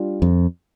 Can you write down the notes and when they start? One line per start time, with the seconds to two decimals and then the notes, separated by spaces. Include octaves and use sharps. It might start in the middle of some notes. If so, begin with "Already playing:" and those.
Already playing: G3 D4 F4
0.22 F2